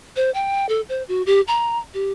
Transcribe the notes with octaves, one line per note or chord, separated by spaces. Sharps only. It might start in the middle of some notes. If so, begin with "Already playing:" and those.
C5
G5
A4
C5
F#4
G4
A#5
G4